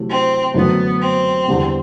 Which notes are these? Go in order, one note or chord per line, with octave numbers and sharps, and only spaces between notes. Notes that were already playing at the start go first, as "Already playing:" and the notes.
Already playing: C3 F#3 A3 E4
C4
F#2 D3 F#3 A3 B3
C4
E2 D3 G3 B3